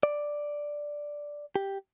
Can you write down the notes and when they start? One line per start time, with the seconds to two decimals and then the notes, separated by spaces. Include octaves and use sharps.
0.03 D5
1.56 G4